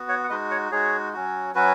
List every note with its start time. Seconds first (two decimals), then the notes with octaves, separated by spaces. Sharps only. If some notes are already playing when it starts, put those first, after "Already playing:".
Already playing: B3 F#4
0.09 C#5 F#5
0.23 F#5
0.29 G#3 D#4 F#4 B4 D#5
0.50 C#5 F#5
0.71 G#3 D#4 F#4 G#4 C#5
1.13 F#3 C#4 F#4
1.55 F#3 C#4 F#4 B4